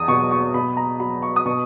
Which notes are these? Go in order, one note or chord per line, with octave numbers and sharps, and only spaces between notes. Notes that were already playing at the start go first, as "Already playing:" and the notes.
Already playing: E2 D#6
B2 F#3 C#6
C#6
B2 B5
A#5
F#3 B5
C#6
D#6
B2 C#6